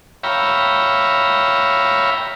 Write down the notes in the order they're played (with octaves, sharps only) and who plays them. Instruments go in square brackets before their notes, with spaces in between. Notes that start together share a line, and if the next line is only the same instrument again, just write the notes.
[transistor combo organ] C#5 E5 F5 G5 A#5 B5